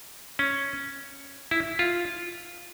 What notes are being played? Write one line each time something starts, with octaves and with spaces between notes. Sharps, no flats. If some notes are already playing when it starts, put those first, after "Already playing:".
C#4
E4
F4